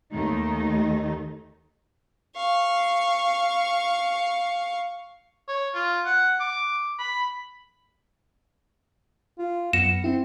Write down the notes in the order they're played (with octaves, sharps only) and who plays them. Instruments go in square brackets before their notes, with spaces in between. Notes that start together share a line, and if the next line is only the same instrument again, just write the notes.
[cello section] D#2 D#3 A3 D#4
[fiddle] F5 C#6
[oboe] C#5
F4
F#5
D6
B5
[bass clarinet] F4
[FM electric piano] F#2 A#6 C#7 [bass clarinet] B3 [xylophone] E7
[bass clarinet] C4 [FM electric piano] E4